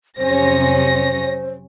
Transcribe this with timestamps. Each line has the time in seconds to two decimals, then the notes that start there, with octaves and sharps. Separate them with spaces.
0.17 F2 C3 F#3 C#4 C5 A#6